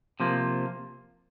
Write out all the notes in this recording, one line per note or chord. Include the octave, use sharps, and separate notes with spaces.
C3 F3 A#3